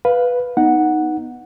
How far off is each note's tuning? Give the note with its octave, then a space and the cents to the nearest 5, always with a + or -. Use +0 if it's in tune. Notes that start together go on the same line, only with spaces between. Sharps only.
B4 +0 F5 +10
B3 +0 D#4 +0 F#5 -5